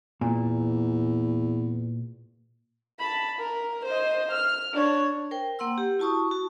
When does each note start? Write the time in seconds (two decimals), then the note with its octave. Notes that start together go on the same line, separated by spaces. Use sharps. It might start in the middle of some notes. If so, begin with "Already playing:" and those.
0.21 E2 A#2
2.99 A5 B5
3.39 A#4
3.85 C5 D#5
4.32 F6
4.73 D4 C#5
5.31 A#4 C5 G5
5.59 A#3 F#5 C6 E6
5.78 G4
5.99 E4 F#4 A5 C#6 D#6
6.31 F#4